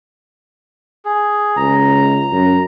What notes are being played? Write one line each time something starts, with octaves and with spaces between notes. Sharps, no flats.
G#4
C#2 A#5
F#2